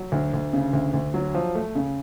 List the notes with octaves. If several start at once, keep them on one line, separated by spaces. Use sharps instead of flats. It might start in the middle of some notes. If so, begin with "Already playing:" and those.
Already playing: F#3
D2
D2
C#3
D2
D2
F#3
F3
A3
C#3